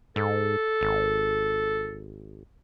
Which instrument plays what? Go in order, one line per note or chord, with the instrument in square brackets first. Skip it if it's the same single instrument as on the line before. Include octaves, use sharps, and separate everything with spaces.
[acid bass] G#2 [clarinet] A4
[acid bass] G#1